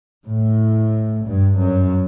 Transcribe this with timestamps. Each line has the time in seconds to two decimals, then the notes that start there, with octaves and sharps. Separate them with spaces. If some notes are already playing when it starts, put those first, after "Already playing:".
0.24 A2
1.24 G2
1.57 F#2